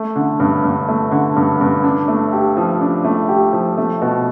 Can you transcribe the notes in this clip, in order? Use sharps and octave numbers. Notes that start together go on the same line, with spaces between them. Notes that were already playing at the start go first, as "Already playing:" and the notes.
Already playing: A3
D3
G2
G2
A3
D3
G2
G2
D4
A3
G4
F3
D4
A3
G4
F3
A3
B2